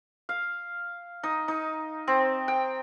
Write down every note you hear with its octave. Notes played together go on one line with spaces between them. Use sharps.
F5
D#4
D#4
C4
G5